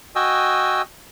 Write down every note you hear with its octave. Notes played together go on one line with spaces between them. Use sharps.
F#4 D#5 G5 G#5 E6